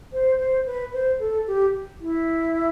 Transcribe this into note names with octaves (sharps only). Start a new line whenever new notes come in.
C5
C5
B4
C5
A4
G4
E4